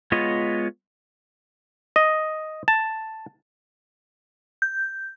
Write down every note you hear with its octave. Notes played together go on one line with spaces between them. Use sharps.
G#3 B3 F4 C#5 D#5
D#5
A5
G6